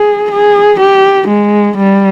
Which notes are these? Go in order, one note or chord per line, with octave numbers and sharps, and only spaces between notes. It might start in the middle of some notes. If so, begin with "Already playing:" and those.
Already playing: G#4
G#4
G4
G#3
G3